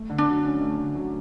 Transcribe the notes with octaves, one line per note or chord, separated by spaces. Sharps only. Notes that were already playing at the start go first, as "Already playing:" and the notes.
Already playing: A3
D3
D4
F#3
C#4
A3
D3
F#3